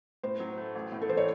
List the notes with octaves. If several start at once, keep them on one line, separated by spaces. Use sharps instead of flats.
A2 C5
F#3
A3
A1
A2
A4
E3 C5
C#5